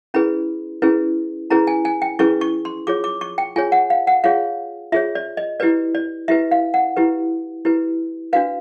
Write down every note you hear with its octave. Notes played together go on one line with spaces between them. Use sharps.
C#4 E4 G#4 B4 B5
C#4 E4 G#4 B4
C#4 E4 G#4 B4 A#5
G#5
G#5
G5
C#4 E4 G#4 B4 C#6
C#6
C6
F4 G#4 C#5 D6
D6
C#6
G5
F4 G#4 C#5 G#5
F#5
F5
F#5
F4 G#4 C#5 F5
F4 G#4 C#5 E5
D5
D#5
E4 G4 B4 D5
D5
E4 G4 B4 E5
F5
F#5
E4 G4 B4
E4 G4 B4
D4 F#4 B4 F5